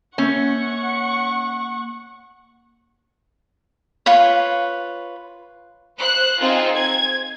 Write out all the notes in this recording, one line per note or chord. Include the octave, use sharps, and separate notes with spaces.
A#3 C#4 F#5 C#6
F4 B4 C#5
C5 F#6
C4 D#4 F4 G#4
G#6